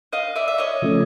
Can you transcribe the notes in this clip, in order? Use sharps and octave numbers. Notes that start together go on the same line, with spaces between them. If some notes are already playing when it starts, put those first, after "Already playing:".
D#5 F5
D5 E5
E5
C#5 D#5
C#3 F3 A3 C#4